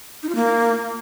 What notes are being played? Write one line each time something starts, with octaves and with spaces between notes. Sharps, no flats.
D#4
F4
A#3